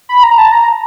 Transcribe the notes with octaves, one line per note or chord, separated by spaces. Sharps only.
B5
A#5
A5
A#5